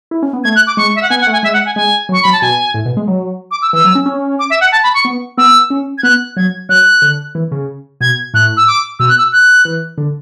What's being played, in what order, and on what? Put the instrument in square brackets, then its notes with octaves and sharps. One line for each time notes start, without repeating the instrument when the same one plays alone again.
[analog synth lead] E4
C#4
B3
[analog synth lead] A3 [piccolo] G#6
[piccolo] F#6
D6
[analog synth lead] G#3 [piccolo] C#6
[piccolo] E5
F#5
[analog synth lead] B3 [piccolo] G#5
[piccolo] F#5
[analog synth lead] A3
[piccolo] G#5
[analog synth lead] G#3 [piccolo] E5
[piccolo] F#5
G#5
[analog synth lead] G#3 [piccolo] G#5
[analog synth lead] F#3
[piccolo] C#6
[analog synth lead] F#3 [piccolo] B5
[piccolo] A5
[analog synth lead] B2 [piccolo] G#5
[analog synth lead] A2
B2
G#3
F#3
[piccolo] D6
E6
[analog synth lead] E3 [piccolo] E6
[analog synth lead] F#3
C#4
C#4
[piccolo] D6
E5
F#5
A5
B5
C#6
[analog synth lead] B3
[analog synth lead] B3 [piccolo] E6
[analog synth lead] C#4
[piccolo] G#6
[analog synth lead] B3 [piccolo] F#6
[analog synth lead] F#3 [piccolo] G#6
[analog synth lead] F#3 [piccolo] F#6
[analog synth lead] D3
E3
C#3
[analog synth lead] B2 [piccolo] G#6
[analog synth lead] A2 [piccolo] F#6
[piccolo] E6
D6
[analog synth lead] B2 [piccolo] E6
[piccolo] F#6
E6
F#6
[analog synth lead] E3
D3